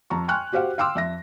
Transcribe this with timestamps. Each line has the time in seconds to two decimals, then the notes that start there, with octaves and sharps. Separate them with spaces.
0.10 F2 A5 A#5 C#6
0.28 G5 G#5 C6 C#6 F6 F#6
0.53 F#4 G4 C5 F5 F#5
0.78 F5 G5 C6 D6 E6 F6
0.95 F2 E5 A#6